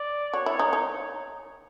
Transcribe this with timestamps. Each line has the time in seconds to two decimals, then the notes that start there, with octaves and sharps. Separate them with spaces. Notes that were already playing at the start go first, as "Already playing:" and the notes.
Already playing: D5
0.33 F#4 C#5
0.46 E4
0.59 D#4
0.73 D#4